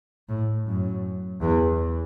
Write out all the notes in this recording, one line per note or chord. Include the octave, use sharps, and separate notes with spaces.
A2
F#2
E2